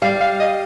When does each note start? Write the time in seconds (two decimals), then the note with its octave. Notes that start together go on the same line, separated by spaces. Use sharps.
0.02 G3 F5
0.21 F5
0.40 D#5